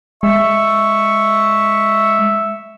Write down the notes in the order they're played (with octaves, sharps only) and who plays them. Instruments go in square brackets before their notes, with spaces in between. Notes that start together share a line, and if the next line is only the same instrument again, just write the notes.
[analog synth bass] G#3 [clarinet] E5 [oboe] C#6